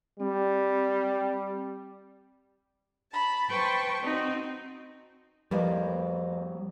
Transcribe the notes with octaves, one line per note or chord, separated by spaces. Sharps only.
G3 C4
A5 B5
B4 C5 G5 A5 C#6
C4 D#4 F#4
F2 F3 G3 A#3 B4